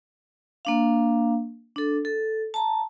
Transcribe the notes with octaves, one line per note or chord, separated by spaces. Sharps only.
A#3 D4 F5
D4 A4
A4
A5 A#5